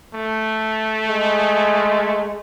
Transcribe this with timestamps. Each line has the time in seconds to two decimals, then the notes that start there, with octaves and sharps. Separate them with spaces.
0.15 A3
1.08 G#3